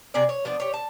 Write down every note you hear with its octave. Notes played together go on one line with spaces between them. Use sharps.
C3 D4 G#4 D5
C#5
F3 B3 D4
G4 C#5
A5